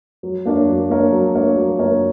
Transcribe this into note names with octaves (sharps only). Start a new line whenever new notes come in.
F#3
A#3 D4 A#4 C#5
F#3
A#3 D4 A#4 C#5
F#3
A#3 D4 A#4 C#5
F#3
A#3 D4 A#4 C#5